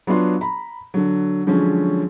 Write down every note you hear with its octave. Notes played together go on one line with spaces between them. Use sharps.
F#3 B3 D4 F4 C6
A#5 B5
D3 F#3
D3 F3 F#3 G#3 C#4